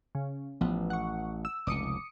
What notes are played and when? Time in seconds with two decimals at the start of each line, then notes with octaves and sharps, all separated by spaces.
0.15 C#3
0.61 A1 F3 B3
0.90 F#5 C#6
1.45 E6
1.67 F1 C#2 D6 D#6 C#7